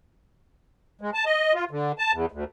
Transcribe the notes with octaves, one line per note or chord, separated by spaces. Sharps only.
G#3
A5
D#5
F4
D3
A5
E2
D2